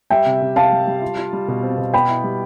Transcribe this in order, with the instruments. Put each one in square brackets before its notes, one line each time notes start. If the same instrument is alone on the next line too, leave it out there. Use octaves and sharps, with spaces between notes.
[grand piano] G3 [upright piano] E5 G5
[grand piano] C3
C3
[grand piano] C3 [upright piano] F5 A5
[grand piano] G3
G3
F4
F4
G3
B2
C4
B2
[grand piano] B3 [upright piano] G5 B5
[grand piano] E4
G3